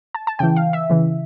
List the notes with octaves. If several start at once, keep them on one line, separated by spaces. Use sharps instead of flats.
A5
A5
C#3 E3 G5
F5
E5
C#3 E3